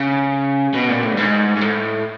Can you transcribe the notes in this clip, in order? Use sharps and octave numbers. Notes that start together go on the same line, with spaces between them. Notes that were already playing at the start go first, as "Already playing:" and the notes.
Already playing: C#3
B2
A#2
A2
G2
G#2
G#2
A2